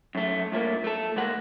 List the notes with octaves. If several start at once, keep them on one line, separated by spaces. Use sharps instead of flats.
F#2 A3
G2 A#2 A3 A#3
A3 A4
D2 G#3 A#3 F#5